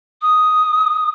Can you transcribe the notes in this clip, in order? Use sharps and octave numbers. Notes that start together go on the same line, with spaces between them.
D#6